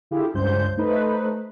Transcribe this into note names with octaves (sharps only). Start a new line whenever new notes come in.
D3 E4 F4 G4 G#4
C#2 G2 C5 G6
A3 D#4 B4 C5